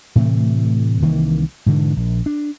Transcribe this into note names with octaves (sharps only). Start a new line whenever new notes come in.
A2 C3 E3 A3
C2 D#3 E3 A#3
G#2 B2 D3 E3
A#1
D4